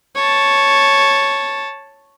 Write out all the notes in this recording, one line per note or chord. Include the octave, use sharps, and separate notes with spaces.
C#5 A5